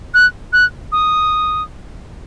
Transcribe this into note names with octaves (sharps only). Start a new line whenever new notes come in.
F#6
F#6
D#6